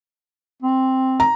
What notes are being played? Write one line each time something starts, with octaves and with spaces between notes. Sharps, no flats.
C4
A#5